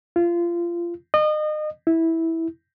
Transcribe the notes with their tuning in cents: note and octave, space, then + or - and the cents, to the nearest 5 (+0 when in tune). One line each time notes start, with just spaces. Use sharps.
F4 -25
D#5 -30
E4 -10